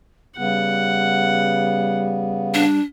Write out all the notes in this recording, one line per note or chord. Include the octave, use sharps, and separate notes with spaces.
C#3 G3 B3 F#5
D4